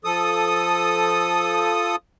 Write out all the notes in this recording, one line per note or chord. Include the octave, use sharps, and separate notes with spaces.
F3 A4 D#6